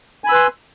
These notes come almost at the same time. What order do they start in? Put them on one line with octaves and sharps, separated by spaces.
G#5 B5 E6 B4 C6